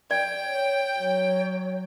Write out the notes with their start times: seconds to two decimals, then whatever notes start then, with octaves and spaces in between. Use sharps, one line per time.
0.11 D5 G5
0.45 C#5
0.97 F#3 C#5